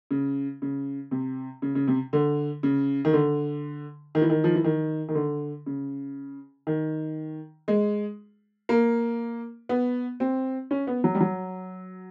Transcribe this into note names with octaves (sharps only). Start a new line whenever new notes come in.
C#3
C#3
C3
C#3
C#3
C3
D3
C#3
D#3
D3
D#3
E3
D#3
F3
E3
D#3
D#3
D3
C#3
D#3
G#3
A#3
B3
C4
C#4
B3
F#3
G3
F#3